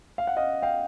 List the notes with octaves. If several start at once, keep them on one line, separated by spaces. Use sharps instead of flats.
F5
F#5
D#5 F5
F5 G5